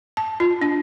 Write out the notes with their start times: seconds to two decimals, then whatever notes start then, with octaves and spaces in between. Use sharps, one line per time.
0.17 A5
0.40 F4
0.61 D4